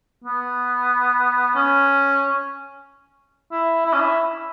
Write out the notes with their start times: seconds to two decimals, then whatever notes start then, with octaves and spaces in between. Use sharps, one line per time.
0.24 B3
1.55 C#4
3.52 E4
3.85 E4
3.93 C#4
4.00 E4